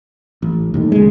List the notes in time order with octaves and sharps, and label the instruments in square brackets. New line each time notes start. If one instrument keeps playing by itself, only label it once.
[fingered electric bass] A1
D#2 A2 D#3
[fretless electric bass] C#3 G#3